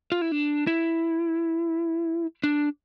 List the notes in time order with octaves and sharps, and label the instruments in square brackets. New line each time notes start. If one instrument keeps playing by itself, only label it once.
[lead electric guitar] F4
E4
D4
E4
D4